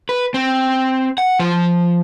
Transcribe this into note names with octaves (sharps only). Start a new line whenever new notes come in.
B4
C4
F#5
F3 C5